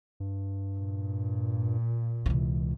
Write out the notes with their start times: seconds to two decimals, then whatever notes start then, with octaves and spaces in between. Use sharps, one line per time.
0.20 G2
0.79 A#2
2.26 C#2 C3 E3